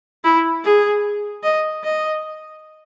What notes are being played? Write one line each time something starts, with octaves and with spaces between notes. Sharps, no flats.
E4
G#4
D#5
D#5